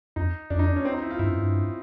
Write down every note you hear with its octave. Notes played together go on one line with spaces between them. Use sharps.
F2 D#4
F2 D4
D#4
D4
C#4
C4
D#4
E4
F4
G2 E4
F#2
G2